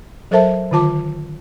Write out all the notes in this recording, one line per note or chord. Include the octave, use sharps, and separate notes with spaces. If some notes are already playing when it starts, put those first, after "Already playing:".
F#3 A4 A#4 C5 E5 A5
D3 D#3 F4 A5 D6